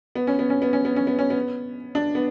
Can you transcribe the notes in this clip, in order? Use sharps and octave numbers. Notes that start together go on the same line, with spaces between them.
B3
C#4
B3
C#4
B3
C#4
B3
C#4
B3
C#4
B3
D4
B3